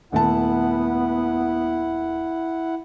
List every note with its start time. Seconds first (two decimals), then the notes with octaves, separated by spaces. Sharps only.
0.12 D#1 A3 B3 E4 F#5 A5